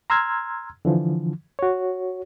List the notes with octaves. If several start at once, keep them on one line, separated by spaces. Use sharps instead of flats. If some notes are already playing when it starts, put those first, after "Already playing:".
A#5 C6 E6 F6 G#6
D3 E3 F3
F#4 C#5